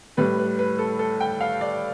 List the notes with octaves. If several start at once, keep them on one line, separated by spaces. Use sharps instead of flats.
A2 G3 B4
B4
B4
A4
A4
G5
F5
D5